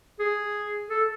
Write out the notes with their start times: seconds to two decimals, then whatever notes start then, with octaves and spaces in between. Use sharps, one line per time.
0.19 G#4
0.89 A4